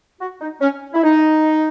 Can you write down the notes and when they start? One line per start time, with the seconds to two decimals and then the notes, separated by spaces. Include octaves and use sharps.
0.20 F#4
0.41 D#4
0.61 C#4
0.94 E4
1.03 D#4